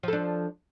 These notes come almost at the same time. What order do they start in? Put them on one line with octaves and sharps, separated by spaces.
F3 A4 D4